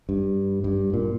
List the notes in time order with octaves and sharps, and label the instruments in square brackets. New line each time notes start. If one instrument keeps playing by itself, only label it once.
[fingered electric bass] G2
G2
A#2